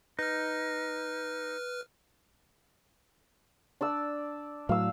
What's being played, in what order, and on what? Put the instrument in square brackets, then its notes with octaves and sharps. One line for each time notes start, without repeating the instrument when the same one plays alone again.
[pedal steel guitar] D#4 [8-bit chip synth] B4 F6
[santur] D4 D5 E6
[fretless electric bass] A2 F#3 [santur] F5 E6